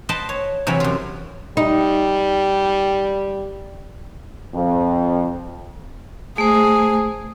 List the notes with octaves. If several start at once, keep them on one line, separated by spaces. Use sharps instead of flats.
B4 C5 D#5 F#5 G5 A5
C#5
C3 E3 F#3 C#5 B5
F#2 F4
G3 D#4
F2
A3 G#4 C5